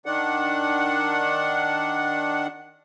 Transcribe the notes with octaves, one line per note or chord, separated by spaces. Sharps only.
D#3 D4 F#5